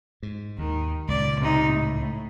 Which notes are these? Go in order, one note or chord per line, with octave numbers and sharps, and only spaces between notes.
G#2
D#2 D#3
C#2 A#2 D5
C3 D#4
A2